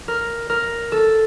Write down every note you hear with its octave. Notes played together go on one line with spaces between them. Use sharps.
A#4
A#4
A4